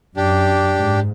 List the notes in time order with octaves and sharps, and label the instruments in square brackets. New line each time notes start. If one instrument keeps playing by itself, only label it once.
[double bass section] F#2 [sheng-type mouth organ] D4 G4
[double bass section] G#2